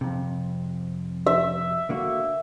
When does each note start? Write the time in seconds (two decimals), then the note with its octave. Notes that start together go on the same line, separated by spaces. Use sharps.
0.01 F2 C3
1.26 E5
1.89 D3 A#3 F#4